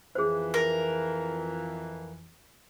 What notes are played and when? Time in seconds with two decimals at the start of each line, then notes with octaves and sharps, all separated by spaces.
0.15 F2 E3 G#4 C5
0.54 A#4